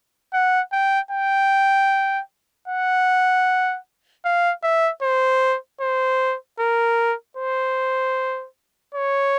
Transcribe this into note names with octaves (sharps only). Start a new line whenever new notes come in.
F#5
G5
G5
F#5
F5
E5
C5
C5
A#4
C5
C#5